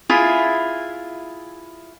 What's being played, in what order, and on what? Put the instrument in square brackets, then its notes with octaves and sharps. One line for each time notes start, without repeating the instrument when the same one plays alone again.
[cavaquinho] E4 F4 G#4 E5